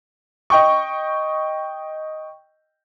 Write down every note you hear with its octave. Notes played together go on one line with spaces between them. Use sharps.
D#5 G5 C#6